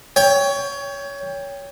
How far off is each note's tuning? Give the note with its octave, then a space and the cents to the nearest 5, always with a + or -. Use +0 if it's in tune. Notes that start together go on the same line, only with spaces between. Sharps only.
C#5 +20 G5 +20